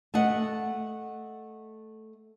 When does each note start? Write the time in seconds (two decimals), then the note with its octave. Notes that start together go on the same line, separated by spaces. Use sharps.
0.14 A3 D#5 F#5